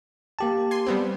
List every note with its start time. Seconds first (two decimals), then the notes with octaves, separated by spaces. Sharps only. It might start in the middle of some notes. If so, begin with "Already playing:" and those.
0.39 A#3 G4 A5
0.71 G#5 C6
0.86 G3 B3 C4